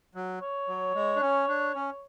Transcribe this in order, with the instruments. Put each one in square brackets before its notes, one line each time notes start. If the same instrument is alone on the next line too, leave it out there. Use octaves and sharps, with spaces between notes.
[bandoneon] F#3
[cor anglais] C#5
[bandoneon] F#3
G#3
D4
C#4
D4
C#4